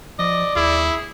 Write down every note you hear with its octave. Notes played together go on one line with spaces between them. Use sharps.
F3 D5 D#5
D#2 E4 G#4